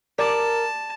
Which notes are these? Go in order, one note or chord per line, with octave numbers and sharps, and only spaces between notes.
A#4 D5 A5